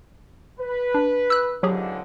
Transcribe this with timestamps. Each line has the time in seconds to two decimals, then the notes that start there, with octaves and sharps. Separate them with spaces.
0.60 B4
0.94 D4
1.30 E6 F#6
1.63 C#2 G#2 D3 F#3 G4 G#4